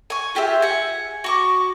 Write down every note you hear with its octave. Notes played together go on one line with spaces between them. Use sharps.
G#5 C#6
F4 G4 G#4 E5
F#5 G#5
F#4 C#6 D6